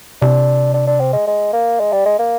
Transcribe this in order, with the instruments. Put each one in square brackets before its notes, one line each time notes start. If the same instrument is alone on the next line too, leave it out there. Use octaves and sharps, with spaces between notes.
[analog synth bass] C3 [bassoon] D4
[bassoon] D4
D4
C4
G#3
G#3
A#3
G#3
G3
G#3
A#3